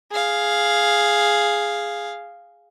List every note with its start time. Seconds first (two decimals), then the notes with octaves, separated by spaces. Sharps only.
0.11 G#4 F5